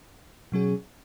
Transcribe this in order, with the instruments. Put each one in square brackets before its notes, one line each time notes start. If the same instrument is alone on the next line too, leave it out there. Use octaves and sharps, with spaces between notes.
[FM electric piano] B2 F#3 C#4 G#4